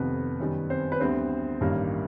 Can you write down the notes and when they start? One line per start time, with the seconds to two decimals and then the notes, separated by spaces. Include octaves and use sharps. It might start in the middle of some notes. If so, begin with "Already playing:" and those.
Already playing: F1 F2 C3 D#3 B3 B4
0.40 F#2 D#3 G3
0.70 C4 C5
0.92 B4
1.00 D2 D3 G3 B3 C4 C5
1.61 A1 G2 D#3 G3 A#3 A#4